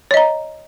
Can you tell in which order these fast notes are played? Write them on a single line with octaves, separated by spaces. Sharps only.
C#5 D#5 A#5